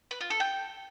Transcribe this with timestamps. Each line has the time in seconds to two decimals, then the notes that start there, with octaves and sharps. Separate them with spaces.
0.11 B4
0.21 F4
0.30 A4
0.40 G5